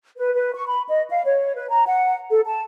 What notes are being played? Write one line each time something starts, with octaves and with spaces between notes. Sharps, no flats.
B4
B4
C#6
B5
D#5
F5
C#5
B4
A#5
F#5
A4
A5